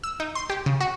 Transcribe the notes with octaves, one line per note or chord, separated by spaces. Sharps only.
E6
D#4
C6
G4
C#3
F#4